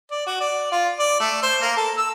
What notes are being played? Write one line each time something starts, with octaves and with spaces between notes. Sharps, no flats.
D5
F#4
D5
F4
D5
A3
C5
A#3
A4
E6